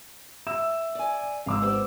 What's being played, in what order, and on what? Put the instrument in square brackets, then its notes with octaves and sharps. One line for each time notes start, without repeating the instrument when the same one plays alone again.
[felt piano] E5 E6 E7
[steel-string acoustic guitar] D5 G#5
[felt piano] G#1 D6 E6 [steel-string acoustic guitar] F5
[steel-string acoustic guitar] B3 G4 C5